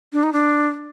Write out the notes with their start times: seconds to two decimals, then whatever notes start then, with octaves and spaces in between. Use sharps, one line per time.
0.13 D4
0.23 D#4
0.33 D4